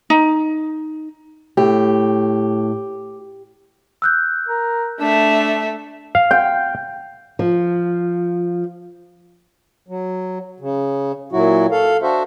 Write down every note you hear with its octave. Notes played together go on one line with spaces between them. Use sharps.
D#4
A2 G4
E6 F#6 G6
A#4
A3 D4 E5
F5
G5
F3
F#3
C#3
A#2 F#3 E4 F#4
A4 F5
D4 F#4 C5 E5